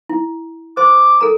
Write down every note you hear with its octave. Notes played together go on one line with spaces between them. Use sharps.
E4
C5 C6 D6
A4 A#4 A#5